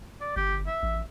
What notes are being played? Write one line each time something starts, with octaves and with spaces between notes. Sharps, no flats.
D5
G1 G4
E5
A1